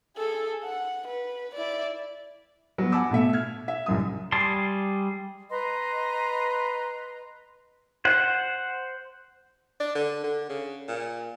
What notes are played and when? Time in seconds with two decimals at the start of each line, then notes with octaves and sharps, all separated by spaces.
0.16 G#4 A4
0.64 F#5
1.08 B4
1.55 E4 D5
2.78 F#3 B3
2.92 F#5 G#5 A5 B5 D6 E6
3.11 B2 A3 E5
3.33 F6 G#6
3.68 E5
3.86 C2 F#2 D#6
4.32 G3 G#4 A5 C6
5.50 B4 D#5 A#5 C6
8.05 C5 F#5
9.80 D4
9.95 D3
10.24 D3
10.49 C#3
10.88 A#2